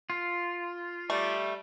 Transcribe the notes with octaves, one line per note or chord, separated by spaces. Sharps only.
F4
G3 A3